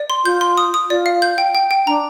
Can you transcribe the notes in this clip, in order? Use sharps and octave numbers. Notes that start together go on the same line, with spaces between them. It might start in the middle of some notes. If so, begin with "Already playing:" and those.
Already playing: D5
C6
F4 G6
C6
D#6
D#6
F4 D5
F5
G6
G5
G5
G5
D4 A#5